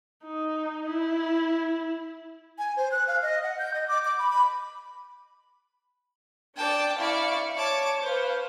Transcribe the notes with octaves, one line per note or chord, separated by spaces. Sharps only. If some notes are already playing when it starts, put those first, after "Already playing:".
D#4
E4
G#5
C5
F#6
F5
D#5
F#5
G6
D#5
D6
D6
B5
B5
D4 D5 G5 A5
E4 D5 F5 C#6
C#5 A5 D6
B4 C5 F5